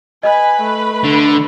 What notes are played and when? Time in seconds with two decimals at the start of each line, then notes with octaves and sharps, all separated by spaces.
0.23 B4 D#5 G#5 B5
0.61 A3
1.04 D3